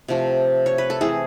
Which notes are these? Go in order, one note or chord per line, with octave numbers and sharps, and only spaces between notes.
C3 F3 A3
C#5
B4
A4
E3 A3 C4 G#4